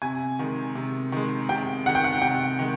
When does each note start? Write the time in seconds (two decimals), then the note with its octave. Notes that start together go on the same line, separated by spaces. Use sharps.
0.02 C3 G#5
0.39 D#3 G#3
0.75 C3
1.12 D#3 G#3
1.49 C3 G5
1.85 D#3 G#3 F#5
1.95 G5
2.04 F#5
2.22 C3 G5
2.59 D#3 G#3